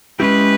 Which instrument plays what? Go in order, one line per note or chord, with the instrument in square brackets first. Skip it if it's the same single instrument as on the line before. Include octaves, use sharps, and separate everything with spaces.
[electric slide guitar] G#3 C#4 E4 G4 [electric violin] B4